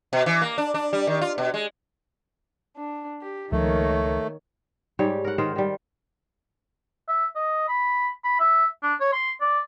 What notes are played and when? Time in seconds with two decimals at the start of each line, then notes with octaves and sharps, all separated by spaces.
0.13 B2
0.26 E3
0.42 A#3
0.58 D4
0.74 D4
0.93 G3
1.07 D#3
1.21 F4
1.38 B2
1.54 G#3
2.76 D4
3.20 G4
3.52 C#2 D#3 F3 A3 A#3 C#5
4.99 G#2 G3 G4 C#5
5.24 A#4 F#5
5.38 D#3 A#4 C5
5.56 D#3 G3
7.08 E5
7.35 D#5
7.68 B5
8.24 B5
8.40 E5
8.83 D4
9.00 C#5
9.13 C6
9.41 D5